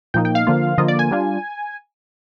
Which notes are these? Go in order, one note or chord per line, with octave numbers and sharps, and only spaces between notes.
A#2 F3 A#3 D#4 G5
G5
F5
D3 F3 A#3 F4
D3 F3 A#3 F4 D#5
D5
G#5
G3 D4 F4